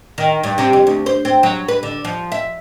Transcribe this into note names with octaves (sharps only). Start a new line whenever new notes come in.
D#3
G2
C3
F2
D2
C5
C4
F#3
B4
D3
F3
E5